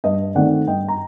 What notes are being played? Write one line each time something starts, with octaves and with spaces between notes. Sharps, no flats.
G2 D#5
D#3 A3 C4 D5 F#5
G2 D#5 G5
A#5